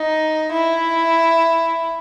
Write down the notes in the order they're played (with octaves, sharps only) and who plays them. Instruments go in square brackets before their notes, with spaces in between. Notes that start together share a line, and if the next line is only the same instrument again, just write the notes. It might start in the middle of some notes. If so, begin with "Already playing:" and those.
Already playing: [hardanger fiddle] D#4
E4